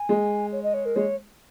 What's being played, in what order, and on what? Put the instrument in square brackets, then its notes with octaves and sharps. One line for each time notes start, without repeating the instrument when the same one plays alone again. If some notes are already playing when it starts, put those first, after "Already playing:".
Already playing: [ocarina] G#5
[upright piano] G#3
[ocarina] C#5
D#5
C#5
A#4
[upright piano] G#3 [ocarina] C#5